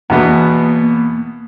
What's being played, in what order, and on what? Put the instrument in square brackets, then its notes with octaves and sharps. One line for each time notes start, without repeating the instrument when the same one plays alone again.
[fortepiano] E2 B2 B3 [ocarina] A#3